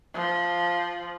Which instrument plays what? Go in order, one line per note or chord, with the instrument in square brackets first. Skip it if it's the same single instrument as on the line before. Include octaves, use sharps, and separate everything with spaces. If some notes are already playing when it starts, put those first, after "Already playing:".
[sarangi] F3